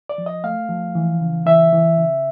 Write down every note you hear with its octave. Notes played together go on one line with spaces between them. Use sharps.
D5
F3
D#5
A3 F5
F3
E3
C#3
E3 E5
E3
C#3